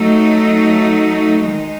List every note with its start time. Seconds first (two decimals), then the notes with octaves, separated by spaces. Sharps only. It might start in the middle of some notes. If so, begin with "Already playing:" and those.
Already playing: F#3 A3 D#4
1.46 D#3 G#3 D#4